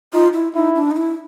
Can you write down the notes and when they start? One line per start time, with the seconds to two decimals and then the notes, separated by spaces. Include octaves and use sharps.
0.13 D#4 F4
0.34 E4
0.55 D#4 E4
0.75 D4
0.91 D#4
0.97 E4